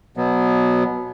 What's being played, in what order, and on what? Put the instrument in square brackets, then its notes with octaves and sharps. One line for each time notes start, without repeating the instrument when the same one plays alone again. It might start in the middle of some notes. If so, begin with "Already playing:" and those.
[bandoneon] B2 F#3 B3